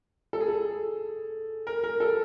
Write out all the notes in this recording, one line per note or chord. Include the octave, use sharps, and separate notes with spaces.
A4
G#4
A4
A#4
A#4
A4